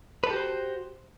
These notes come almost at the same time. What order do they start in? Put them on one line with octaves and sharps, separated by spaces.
B4 A4 G4 F#4 C5